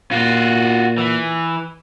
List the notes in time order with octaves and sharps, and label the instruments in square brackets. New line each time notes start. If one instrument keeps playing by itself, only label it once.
[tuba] A#2 [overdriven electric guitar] F4 F#4
[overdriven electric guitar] E3